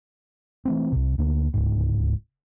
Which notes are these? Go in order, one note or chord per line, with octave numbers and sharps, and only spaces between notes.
E3 A3 C4
C2 C3
D2 D3 A#3
D1 C#2 G#2